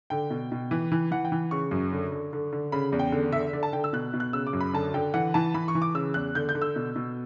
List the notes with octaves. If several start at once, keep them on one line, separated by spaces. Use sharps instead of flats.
D3 G5
B2
B2
E3
E3
E3 F#5
G5
E3
C#3 C#6
F#2
D3
D3
D3
D3
C#3 B5
E2
G5
D3
D3 E5
D3 D5
A5
D3 G5
E6
B2 F#6
B2
F#6
C#3 E6
D6
F#2
B5
D3 A5
D3 G5
E3 F#5
E3 A5
E3 B5
C#6
E3
D6
C#3 E6
E2 F#6
D3 G6
G6
D3
E6
B2
B2